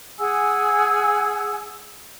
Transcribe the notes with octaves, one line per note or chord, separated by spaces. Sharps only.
G#4 F#5 G#5 E6